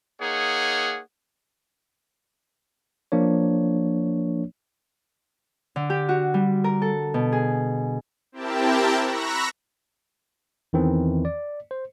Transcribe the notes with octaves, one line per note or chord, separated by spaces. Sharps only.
A#3 D#4 G#4 C#5 F#5
F3 A#3 D4 C#5
D3
G4
F#4
G3
A#4
A4
B2
G#4
C4 E4 G4 A#4 G5 A5
A#5 B5 C#6 E6 F#6 A#6
E2 D#3 E3 C4
D5
C5